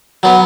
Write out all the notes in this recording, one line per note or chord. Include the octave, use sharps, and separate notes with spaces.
F#3 B3